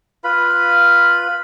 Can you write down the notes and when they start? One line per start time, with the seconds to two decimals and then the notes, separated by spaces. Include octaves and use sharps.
0.24 F4 B4 B5